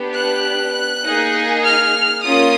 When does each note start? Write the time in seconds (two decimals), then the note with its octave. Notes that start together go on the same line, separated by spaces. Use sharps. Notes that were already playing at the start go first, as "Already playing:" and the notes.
Already playing: B3 D4 G4
0.14 F#6
1.04 A#3 D#4 G#4
1.65 F6
2.24 A#3 C#4 F4 D#6